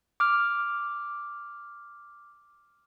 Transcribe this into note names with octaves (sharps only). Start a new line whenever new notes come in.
D6 F6